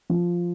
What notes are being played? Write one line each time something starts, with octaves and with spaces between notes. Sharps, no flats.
F3